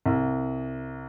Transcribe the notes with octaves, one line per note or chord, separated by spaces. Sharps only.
C2